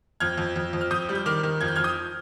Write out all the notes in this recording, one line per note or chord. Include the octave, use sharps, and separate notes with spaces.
F2 F6 G#6
F2
F2
F2
F6
F2 D#6 G6
G3
G6
D#3 D6 F6
D#3
F2 G#6
G6
F2 F6 G#6
D#6 G6